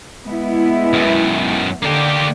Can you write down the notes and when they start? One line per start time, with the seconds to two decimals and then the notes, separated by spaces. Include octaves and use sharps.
0.23 G#3 B3 E4
0.93 F#2 D#3
1.83 D3 A#3 G4